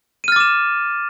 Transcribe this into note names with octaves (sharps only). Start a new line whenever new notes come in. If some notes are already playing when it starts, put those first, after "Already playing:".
D6 F6 A6 D#7 E7